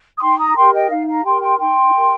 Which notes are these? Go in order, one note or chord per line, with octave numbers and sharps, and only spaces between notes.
D#6
D#4 G5 C6
A#5 D#6
G4 A#4 G5 C6
D#5 G5
D#4 F5
F5 A#5
G4 A#4 G5 C6
G5 C6
D#4 G5 C6
G4 A#4